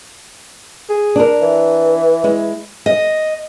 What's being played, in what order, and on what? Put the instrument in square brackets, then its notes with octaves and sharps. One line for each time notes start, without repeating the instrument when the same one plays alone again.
[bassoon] G#4
[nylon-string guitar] D4 A#4
[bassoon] E3
[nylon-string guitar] G#3 E4
[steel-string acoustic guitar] D#5